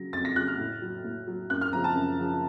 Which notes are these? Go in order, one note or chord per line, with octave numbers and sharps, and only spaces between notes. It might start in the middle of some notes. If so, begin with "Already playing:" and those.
Already playing: C#3 F#3 A#6
F2 A6
A#6
C#3 F#3 F#6
F6
A2
F#3
A2
F#3
F#2 F#6
F6
C#3 F3 A#5
A5
F#2
C#3 F3